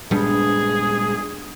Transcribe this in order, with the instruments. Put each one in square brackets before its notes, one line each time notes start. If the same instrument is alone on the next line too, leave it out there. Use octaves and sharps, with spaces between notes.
[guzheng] G2 B3 [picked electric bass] A#2 G3 G#3 [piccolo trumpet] G#4